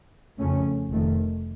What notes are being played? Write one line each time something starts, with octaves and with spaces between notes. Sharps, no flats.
F2 C#3 A3 C#4
F1 F2 D#3 A3